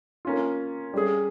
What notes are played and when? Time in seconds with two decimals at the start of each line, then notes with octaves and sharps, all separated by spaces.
0.25 A#3 C#4 F4
0.94 G3 C#4 G#4